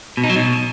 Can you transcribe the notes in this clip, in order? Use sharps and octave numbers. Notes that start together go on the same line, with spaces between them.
B2
D#4
F#3
B2